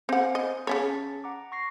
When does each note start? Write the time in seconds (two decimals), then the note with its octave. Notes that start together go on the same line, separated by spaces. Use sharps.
0.09 C4 C5 F5 F#5 G#5
0.35 D#5
0.67 C#3 C#4 C#5 A5 A6 B6
1.24 F#5 A#5 D6
1.52 C#6 A#6 C7